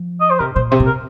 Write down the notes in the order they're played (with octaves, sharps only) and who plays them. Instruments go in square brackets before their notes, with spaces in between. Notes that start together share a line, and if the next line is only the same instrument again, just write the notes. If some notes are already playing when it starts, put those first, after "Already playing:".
Already playing: [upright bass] F3
[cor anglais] D#5
C5
[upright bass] C3 [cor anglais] A#4
[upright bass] A#2 [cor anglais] C5
[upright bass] C3 [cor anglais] C5
[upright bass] A#2
[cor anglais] A#4